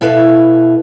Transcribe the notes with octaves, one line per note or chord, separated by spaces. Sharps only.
B2 E4 A4 B4 E5 F5